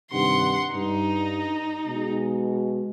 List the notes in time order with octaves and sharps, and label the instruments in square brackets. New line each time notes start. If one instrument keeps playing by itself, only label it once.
[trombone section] G2 C3 D#3 [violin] F#5 C6
[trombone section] G2 [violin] D#4
[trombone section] B2 G#3